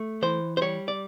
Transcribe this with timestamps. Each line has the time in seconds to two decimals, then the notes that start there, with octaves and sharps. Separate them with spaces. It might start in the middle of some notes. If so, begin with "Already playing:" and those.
Already playing: A3
0.22 E3 C5
0.57 C5
0.61 G3 C#5
0.88 D5